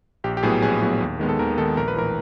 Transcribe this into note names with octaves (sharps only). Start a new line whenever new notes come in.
A#1 G4
G4
A2 F#3 B3 G#4
A#1 G#4
A2 F#3 B3
D#2
D#3 G#3 B3
A4
D#2 A#4
D#3 G#3 B3 A4
A#1 A#4
B4
A2 E3 A#4